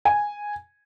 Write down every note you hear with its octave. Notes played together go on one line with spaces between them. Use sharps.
G#5